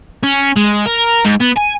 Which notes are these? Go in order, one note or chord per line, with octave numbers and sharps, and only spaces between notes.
C#4
G#3
A#4
G#2
B3
G#5